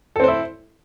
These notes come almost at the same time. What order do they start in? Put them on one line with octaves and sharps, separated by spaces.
A4 C4 C5 E4